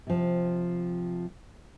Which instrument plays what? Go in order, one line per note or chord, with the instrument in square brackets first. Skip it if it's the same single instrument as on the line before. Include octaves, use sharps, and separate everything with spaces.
[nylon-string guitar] C3 F3